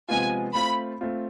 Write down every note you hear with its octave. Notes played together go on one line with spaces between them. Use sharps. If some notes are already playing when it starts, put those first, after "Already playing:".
C3 F3 G#3 B3 F4 G#5
A3 C4 F4 B5
A3 C4 F4